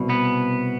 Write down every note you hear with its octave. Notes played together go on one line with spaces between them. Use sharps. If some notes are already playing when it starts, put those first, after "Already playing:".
Already playing: C2 B2
B3